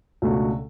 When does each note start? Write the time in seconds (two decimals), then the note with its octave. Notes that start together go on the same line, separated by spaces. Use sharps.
0.22 C#2 B2 A3 D4 F#4